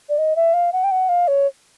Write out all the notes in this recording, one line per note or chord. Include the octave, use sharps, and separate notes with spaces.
D5
D#5
E5
F5
F#5
G5
F#5
F5
C#5